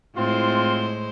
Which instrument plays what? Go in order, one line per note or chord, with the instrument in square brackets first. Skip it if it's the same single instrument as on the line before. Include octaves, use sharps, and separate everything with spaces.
[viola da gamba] A2 G#3 C5 [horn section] C4 E4 F4